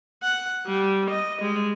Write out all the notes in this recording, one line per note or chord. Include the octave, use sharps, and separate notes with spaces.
F#5
G3
D#5
G3 G#3